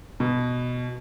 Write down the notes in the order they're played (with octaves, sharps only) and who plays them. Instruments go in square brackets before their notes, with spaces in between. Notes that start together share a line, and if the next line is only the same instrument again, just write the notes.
[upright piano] B2